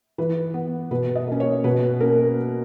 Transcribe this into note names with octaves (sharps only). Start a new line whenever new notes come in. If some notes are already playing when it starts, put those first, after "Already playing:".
E3 B4
B3
B2 B4
D#5
A#3 C#4
C#5
B2 B4
A#3 C#4 A#4